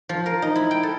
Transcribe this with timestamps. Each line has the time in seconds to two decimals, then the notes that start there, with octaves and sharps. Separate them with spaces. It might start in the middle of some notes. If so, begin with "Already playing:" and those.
0.09 F3
0.26 A#4
0.42 D#4
0.56 E4
0.71 G5
0.83 A4